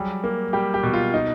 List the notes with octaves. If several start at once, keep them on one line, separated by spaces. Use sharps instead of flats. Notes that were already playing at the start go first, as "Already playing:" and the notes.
Already playing: F#3 G3 G#4
A#3
G3 G4
G4
B2
F4
D#4